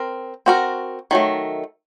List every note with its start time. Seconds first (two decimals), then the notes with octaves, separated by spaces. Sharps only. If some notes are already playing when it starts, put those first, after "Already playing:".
Already playing: C4 A#4
0.46 C4 F#4 A#4
1.11 D#3 F#3 A3